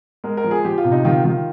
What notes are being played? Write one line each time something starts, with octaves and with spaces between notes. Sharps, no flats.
G#3 A#4
A#4
F3
G#4
F3 G4
F4
C3
D#4
D#3 F4
D#3 F4